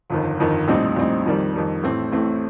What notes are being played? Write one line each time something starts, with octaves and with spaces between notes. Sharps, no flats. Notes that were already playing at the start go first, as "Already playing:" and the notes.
G1 F2 D#3
G1 F2 D#3
A#1 A2 G3 C4 D#4
A#1 A2 G3 C4 D#4
F2 D#3 G3
F2 D#3 G3
A1 A2 A3 C4
A1 A2 A3 C4